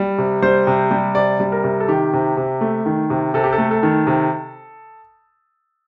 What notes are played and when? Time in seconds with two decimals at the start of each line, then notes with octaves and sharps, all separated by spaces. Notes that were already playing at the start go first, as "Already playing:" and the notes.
Already playing: G3
0.18 C3
0.42 G3 C5
0.67 C3
0.91 G3
1.15 C3 D5
1.40 G3
1.52 A#4
1.64 C3
1.80 A4
1.88 D#3 G4
2.13 C3
2.37 C3
2.61 A3
2.86 D#3
3.10 C3
3.34 C3 A4
3.44 G4
3.53 A4
3.58 A3
3.71 A4
3.83 D#3
4.07 C3